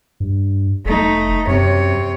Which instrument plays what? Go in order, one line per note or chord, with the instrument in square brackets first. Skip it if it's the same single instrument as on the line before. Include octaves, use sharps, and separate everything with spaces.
[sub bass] G2
[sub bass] F1 [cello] A3 D#4
[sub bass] F#2 [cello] C3 C#5